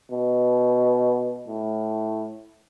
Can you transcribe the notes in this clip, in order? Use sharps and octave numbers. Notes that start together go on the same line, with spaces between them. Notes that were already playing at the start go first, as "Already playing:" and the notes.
B2
A2